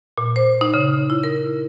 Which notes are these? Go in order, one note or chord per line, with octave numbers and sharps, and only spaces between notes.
A#2
C5
D#4
C#3
E4
A#4